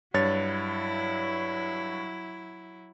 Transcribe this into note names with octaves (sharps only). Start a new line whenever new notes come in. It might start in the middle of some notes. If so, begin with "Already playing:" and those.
G2 F#3 E4 C#5 A6